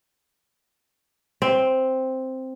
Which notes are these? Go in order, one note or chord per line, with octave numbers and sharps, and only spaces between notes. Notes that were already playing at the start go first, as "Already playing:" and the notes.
C4